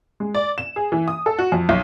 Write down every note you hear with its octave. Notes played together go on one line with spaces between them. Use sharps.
G#3
D5
E7
G#4
E3
D#6
A4
F#4
F2
B1